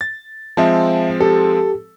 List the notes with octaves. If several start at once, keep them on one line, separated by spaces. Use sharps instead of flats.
A6
F3 G#3 C4 E5 A5
G4 A4